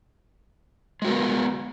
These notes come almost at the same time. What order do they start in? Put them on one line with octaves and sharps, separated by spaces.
G#3 F#4 A#4 B3